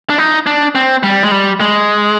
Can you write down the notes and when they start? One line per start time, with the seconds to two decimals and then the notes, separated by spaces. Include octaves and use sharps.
0.10 D4
0.18 D#4
0.46 D4
0.75 C4
1.03 G3
1.23 G#3
1.32 G3
1.60 G#3